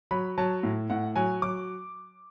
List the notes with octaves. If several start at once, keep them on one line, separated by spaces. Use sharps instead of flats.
F#3 B5
F#3 A5
A2
A2 F#5
F#3 G#5
F#3 D6